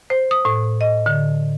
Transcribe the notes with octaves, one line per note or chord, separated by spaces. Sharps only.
C5
D#6
A2
D#5
D3